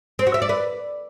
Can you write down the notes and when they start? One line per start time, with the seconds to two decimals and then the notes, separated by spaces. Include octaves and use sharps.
0.19 C4
0.27 F#4
0.34 E5
0.42 D5
0.49 B4